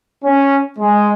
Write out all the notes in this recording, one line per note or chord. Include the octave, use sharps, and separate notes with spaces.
C#4
G#3